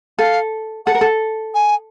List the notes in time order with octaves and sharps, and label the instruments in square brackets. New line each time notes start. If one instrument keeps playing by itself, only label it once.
[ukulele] A4 [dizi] F5
[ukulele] A4 [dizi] F#5
[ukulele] A#4
A4
[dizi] G#5